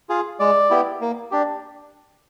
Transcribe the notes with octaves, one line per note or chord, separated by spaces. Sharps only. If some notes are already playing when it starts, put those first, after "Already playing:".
F4 G#4
G#3 D5
B3 E4 G4
A#3
D4 G4